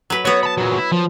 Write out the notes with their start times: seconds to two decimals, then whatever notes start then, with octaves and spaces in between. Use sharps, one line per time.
0.10 F#3 B4
0.25 B3 F#4 C#5
0.43 A5 B5
0.57 A#2 F#3
0.78 E4
0.92 F3